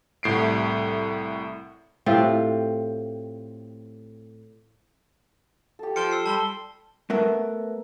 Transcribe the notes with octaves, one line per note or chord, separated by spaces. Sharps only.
C2 A2 C7 D7
A2 C4 F4 G4
G4 A4
F3 C#7 D7 G7
E6 C7
G3 A5 C6 G7
A3 B3 A#4 E5